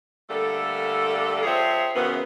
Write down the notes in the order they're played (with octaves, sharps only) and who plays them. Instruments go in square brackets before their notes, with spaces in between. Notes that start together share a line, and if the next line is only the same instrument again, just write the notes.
[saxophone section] D3 G3 A3 A#3 A4
F3 C4 G#4 C#5 E5
F#2 C#3 E3 B3